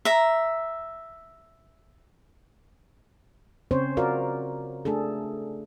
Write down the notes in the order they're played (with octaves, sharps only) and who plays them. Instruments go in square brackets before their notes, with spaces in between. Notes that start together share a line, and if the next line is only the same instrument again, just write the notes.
[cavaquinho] E5 A#5
[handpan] C#3 C4 C#4 C5 C#5
F4 F#4 A#4 D5 F5
A3 D4 G#4 A4